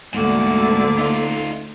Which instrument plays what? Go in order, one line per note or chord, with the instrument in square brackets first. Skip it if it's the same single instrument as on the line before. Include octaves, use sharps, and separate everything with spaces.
[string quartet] D2 D3 D5 [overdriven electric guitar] G#2 F#4 [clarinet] A#3
[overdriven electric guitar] D#4 F4